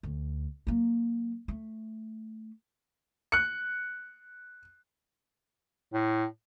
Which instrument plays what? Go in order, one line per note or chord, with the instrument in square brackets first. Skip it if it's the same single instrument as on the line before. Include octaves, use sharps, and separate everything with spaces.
[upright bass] D2
F#3 A#3
A3
[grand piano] F#6 C#7
[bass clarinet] A2